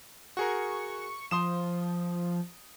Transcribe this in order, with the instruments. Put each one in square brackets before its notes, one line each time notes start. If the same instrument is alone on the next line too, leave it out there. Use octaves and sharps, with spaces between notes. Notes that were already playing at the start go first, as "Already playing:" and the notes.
[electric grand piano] F#4 G#4 A#4 [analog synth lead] C#6
[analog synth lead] F3 [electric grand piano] C6 D#6 E7